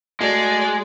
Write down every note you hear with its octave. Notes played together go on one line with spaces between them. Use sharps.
G#3 A3 F#4 D5